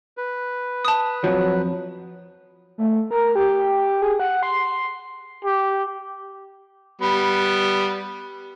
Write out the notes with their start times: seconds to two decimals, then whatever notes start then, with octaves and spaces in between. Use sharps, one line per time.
0.17 B4
0.85 A5 D#6
1.24 F2 G#2 F3 F#3
2.78 A3
3.11 A#4
3.35 G4
4.02 G#4
4.20 F#5
4.43 C6
5.45 G4
7.02 G3 B3